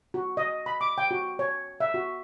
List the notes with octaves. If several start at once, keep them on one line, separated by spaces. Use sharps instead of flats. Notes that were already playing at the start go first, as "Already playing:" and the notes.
F#4
D#5
B5
D6
G5
F#4
C#5
E5
F#4